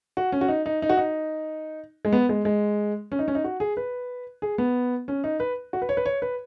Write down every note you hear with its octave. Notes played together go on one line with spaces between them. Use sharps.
F#4
C#4
F#4
D#4
D#4
D#4
F#4
D#4
G#3
B3
G#3
G#3
C#4
D#4
C#4
D#4
F#4
G#4
B4
G#4
B3
C#4
D#4
B4
F#4
B4
C#5
B4
C#5
B4